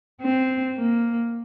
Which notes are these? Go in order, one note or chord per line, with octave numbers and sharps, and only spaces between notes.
C4
A#3